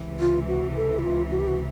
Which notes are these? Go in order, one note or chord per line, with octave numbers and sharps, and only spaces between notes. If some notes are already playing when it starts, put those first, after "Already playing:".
Already playing: C#2 C3 E3
F4
F#4
A4
E4
F4
F#4
G4
F#4